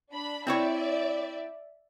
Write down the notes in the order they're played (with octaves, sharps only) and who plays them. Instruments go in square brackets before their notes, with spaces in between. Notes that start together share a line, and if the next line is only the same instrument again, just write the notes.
[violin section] D4 B5
[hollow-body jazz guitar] C4 E4 C#5 [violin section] D5 E5